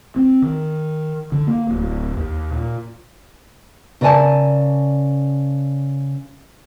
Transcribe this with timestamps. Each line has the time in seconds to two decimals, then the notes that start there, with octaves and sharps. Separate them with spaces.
0.16 C4
0.42 D#3
1.32 D3
1.47 A#3
1.69 D1
2.17 D#2
2.51 A#2
4.01 C#3 A#4 D5 D#5 G#5 A5